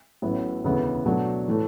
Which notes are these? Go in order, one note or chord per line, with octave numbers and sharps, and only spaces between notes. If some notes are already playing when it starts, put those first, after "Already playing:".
A1 A2 F#3 B3 E4
E1 D2 C#3 E3 B3
B2 F#3 A3 D4
A2 E3 A3